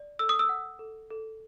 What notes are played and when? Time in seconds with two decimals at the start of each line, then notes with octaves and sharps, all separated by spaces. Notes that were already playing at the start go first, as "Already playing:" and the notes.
Already playing: D5
0.19 A4 E6
0.29 D#6
0.39 E6
0.49 F#5
0.79 A4
1.10 A4